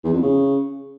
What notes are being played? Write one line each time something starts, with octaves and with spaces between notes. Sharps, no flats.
E2
F2
C#3